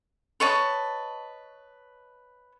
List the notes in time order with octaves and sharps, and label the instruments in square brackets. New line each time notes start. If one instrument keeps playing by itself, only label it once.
[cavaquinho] B4 C#5 D#5 A5